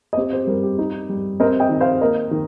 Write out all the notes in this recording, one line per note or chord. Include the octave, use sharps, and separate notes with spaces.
D#5
C4 G4 C5
G4 C5
G3 A#4
G4
D#4
G3
C4 A#4 D#5
D#5 G5
D#3
C5 F5
A#3 A#4 D#5
D#3